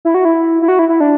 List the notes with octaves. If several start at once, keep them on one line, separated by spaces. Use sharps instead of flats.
E4
F#4
E4
E4
F#4
E4
E4
D4